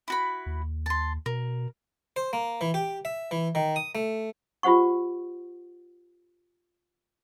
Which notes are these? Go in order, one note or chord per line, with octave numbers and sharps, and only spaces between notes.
E4 F#4 B5
D#2
A5 C6
B2 A#4
C5
A#3
E3
G4
E5
E3
D#3
D#6
A3
F4 G4 C5 F#5 C#6